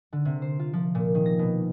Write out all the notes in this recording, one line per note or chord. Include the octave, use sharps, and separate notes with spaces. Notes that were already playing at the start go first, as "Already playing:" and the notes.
D3
C3
C5
F4
F3
A#2
D#3
A#6
B2